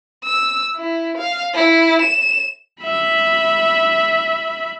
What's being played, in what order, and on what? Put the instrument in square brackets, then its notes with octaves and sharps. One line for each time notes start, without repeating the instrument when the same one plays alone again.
[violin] E6
E4
F5
E4
E7
[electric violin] E5 B5